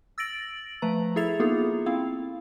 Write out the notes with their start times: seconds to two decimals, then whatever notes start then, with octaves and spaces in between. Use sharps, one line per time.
0.18 E6 A6 A#6 D7 F#7
0.82 F3 A3 B4 A#5
1.16 E4 G#4 A4 E5 A6 F7
1.40 A#3 B3 D#4 F4 G#4 A4
1.86 C4 E4 F5